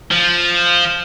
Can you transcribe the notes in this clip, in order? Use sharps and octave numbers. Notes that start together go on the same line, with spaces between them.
F3